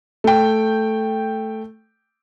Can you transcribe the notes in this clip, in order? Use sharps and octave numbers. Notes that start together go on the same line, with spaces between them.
A3 G5